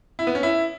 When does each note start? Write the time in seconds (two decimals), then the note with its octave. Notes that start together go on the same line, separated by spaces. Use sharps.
0.19 E4
0.27 B3
0.35 C#4
0.43 E4